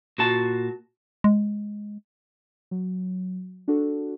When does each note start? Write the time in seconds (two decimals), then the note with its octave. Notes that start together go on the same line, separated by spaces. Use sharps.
0.18 A#2 F#4 A5
1.24 G#3
2.71 F#3
3.68 D4 F#4 A4